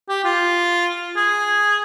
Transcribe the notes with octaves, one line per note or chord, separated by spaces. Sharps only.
G4
F4
G#4